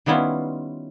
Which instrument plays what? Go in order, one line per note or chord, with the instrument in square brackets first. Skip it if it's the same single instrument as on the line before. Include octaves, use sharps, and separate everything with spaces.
[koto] D#3 G3 B3 C#4 E4 F4